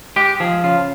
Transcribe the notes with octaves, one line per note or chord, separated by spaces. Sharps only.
G#3 G4
F3 G#4
C#3 F4